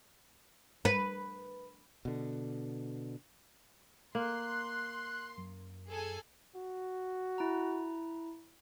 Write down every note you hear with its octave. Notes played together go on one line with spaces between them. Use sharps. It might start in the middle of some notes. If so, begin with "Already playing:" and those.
B4
B2 D3
A#3 C6 F#6
F#2
G#4 A4 G#5
F#4
E4 A#5